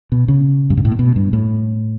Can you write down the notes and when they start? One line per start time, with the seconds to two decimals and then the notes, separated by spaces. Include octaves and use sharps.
0.12 B2
0.28 C#3
0.70 G2
0.77 G#2
0.85 A2
0.92 A#2
0.99 B2
1.16 G2
1.33 A2